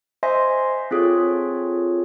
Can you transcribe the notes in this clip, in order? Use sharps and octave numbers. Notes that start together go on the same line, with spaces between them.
C5 D#5 E5 G#5 C6
C4 F4 G#4 A4 C#5